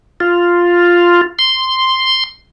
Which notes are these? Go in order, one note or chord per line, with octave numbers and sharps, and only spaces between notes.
F4
C6